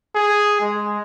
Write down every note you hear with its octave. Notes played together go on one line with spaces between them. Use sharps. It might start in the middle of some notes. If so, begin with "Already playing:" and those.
G#4
G#3